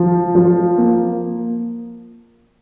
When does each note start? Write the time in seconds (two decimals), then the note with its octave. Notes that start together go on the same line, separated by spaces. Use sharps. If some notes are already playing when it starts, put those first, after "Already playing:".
Already playing: F3
0.35 F3
0.78 A#3